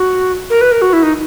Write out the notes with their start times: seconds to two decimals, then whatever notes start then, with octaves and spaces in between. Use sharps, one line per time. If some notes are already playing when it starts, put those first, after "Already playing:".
Already playing: F#4
0.50 A#4
0.61 B4
0.71 A#4
0.82 F#4
0.93 E4
1.03 D#4